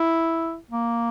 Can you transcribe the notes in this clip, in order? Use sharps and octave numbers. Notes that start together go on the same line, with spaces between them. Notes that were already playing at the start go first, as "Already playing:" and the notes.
Already playing: E4
A#3